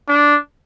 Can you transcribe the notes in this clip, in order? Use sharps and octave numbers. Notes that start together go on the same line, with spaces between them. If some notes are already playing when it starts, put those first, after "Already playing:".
D4